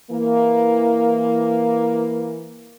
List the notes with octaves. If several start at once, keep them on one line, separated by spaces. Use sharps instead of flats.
E3 A#3